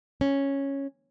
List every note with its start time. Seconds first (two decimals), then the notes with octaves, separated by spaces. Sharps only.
0.21 C#4